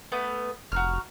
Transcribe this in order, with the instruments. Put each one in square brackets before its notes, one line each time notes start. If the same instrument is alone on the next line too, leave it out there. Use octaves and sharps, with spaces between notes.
[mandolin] A3 B3 B4
[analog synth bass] F1 [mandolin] F#4 A#5 F6